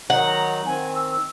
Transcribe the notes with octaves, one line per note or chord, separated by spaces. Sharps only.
D#3 F#3 D#4 F#5
A#5
D#3 C4 G#5
E6